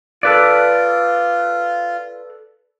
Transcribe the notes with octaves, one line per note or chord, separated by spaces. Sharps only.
F4 A4 B4 D5